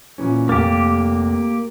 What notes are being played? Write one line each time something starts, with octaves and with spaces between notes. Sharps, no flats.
A#2 E3 C#4
F1 A#3 G4 A6